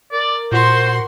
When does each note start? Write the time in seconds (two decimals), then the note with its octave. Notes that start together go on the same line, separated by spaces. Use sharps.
0.12 A#4 D5
0.52 A#2 F#4 C5 C6